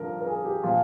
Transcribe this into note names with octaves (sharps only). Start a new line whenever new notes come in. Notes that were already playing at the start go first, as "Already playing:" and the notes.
Already playing: G2 D3 F3 A#4
A#4
G#4
G4
A#2 F3 F4